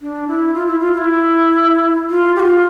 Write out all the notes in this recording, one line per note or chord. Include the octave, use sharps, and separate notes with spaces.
D4
E4
F4
E4
F4
F4
E4
F4
G4
F4